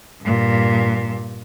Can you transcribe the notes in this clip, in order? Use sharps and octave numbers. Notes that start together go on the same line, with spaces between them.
G2 A#2